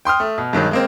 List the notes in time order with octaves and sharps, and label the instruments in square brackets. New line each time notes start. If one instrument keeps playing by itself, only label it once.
[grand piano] G5 C6 D#6 F6
A3
B2
G2 D#3 F#3 G#3
G#3 A#3 C4